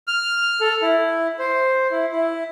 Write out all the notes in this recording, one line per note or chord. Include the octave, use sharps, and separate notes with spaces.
F6
A4
E4
C5
E4
E4